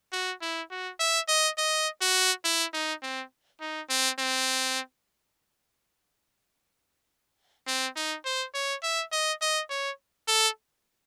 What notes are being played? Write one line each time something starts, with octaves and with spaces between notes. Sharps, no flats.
F#4
E4
F#4
E5
D#5
D#5
F#4
E4
D#4
C4
D#4
C4
C4
C4
D#4
C5
C#5
E5
D#5
D#5
C#5
A4